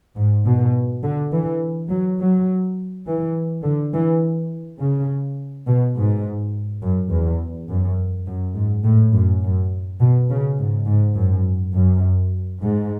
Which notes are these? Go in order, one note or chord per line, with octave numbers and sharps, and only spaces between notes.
G#2
B2
D3
E3
F#3
F#3
E3
D3
E3
C#3
B2
G#2
F#2
E2
F#2
F#2
G#2
A2
F#2
F#2
B2
C#3
G#2
G#2
F#2
F#2
G#2